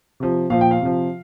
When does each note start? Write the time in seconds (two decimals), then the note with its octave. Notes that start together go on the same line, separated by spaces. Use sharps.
0.20 C3 F3
0.50 A#2 F3 F5
0.61 G5
0.71 F5
0.81 C3 F3